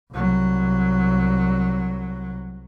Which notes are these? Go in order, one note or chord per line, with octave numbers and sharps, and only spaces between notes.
C2 F#3